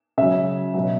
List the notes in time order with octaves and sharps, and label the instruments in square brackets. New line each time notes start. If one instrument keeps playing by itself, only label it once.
[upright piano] C#3 F#3 E5
B2 F#3